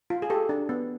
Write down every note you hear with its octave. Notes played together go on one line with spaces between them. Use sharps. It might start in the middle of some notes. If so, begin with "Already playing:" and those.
F4
G#4
G4 A4
D4
B3